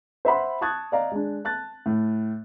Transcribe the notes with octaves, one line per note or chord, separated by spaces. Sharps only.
C5 E5 F#5 B5 C6
A5 C#6 D#6 F#6 G#6 A6
D5 D#5 F5 A#5
G#3 D4
A5 F#6 A6
A2